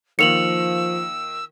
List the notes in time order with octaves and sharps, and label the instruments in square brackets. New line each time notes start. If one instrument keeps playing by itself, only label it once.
[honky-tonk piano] D#3 A#3 F4 [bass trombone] F3 [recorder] E6 [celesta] C#7 F7 F#7